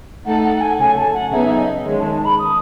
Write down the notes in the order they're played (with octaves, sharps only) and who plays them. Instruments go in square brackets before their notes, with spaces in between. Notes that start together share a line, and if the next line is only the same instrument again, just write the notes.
[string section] A3 D#4 A4 [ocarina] F#5
[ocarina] F#5
F#5
G#5
[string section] C#3 F#3 A3 [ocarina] G#5
[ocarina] A5
F#5
[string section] C#3 F#3 B3 D#4 G#4 [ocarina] E5
[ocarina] D#5
[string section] D#3 G#3 C#4 [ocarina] C#5
[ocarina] A5
A5
B5
D#6